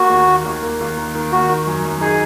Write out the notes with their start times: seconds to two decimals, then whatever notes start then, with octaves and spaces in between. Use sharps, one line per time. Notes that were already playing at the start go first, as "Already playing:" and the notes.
Already playing: A#3 F#4
0.10 D#2
0.28 D#3
0.45 D#2
0.62 A#3
0.81 D#2
0.97 D#3
1.15 D#3
1.32 D#3 F#4
1.49 D#3
1.67 F#2
1.85 F#2
2.01 D#4 G#4